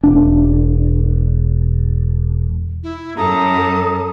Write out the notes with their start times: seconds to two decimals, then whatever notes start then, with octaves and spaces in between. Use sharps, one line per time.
0.03 E1 D4
2.83 E4
3.18 F#2 A4 A#5 D#6